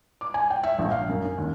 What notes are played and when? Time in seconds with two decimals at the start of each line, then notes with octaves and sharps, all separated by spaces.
0.21 D6
0.34 G#5
0.50 G5
0.63 E5
0.79 A#1
0.91 F5
1.09 F#2
1.25 C#4
1.38 D#2